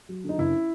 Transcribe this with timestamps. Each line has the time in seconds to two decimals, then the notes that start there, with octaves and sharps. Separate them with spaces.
0.09 F#3
0.24 D3
0.29 D#4
0.38 F#1 E4